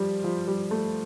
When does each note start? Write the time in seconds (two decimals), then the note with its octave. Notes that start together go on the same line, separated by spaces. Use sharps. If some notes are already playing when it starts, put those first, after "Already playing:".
Already playing: F3 G3
0.24 F3
0.47 G3
0.71 A3